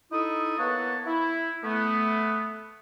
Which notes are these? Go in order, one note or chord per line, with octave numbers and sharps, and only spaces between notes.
D#4 E4 A4 D#6
A#3 B3 B4 C#5 F#5 A5
E4
A3 B3